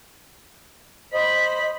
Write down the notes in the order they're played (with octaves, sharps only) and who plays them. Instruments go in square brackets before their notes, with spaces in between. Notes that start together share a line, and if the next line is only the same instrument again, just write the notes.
[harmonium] C5 D#5 [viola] B5